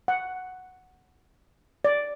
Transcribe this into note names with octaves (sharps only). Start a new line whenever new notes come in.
F#5
D5